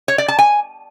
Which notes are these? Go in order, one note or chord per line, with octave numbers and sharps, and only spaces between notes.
C#5
D5
A5
G#5